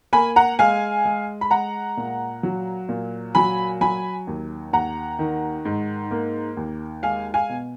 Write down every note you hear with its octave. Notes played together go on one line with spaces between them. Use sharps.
A#3 G#5 B5
F#5 A#5
G#3 F5 G#5
G#3
B5
G#3 F#5 A#5
A#2
F#3
A#2
F#3 G#5 B5
F#3 G#5 B5
D#2
D#2 F#5 A#5
D#3
G#2
A#3
D#2
G#3 F5 G#5
F5 G#5
B2